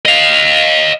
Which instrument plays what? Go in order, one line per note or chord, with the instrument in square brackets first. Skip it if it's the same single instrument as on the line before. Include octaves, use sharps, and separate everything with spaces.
[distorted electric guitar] D#5 F5